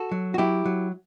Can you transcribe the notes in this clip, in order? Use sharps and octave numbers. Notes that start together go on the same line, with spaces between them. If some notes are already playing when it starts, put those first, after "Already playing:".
Already playing: F#4 A4
F#3
F#4
F#3 E4 G4
F#3